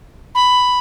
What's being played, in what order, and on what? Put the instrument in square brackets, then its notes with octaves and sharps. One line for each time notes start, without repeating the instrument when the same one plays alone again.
[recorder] B5